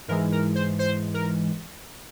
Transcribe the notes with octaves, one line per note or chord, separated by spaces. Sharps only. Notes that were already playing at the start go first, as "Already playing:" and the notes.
G#2 E3 G#3 A#4
A#4
C5
C5
A#4